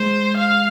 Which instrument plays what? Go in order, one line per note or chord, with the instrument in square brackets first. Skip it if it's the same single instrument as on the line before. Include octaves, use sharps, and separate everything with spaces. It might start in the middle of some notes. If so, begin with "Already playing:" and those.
Already playing: [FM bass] G#3 [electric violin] C5
[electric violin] F5